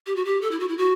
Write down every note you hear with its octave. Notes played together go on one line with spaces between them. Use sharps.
G4
F#4
G4
A4
E4
F#4
E4
F#4